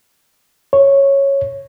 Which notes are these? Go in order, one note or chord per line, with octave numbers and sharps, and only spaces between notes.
C#5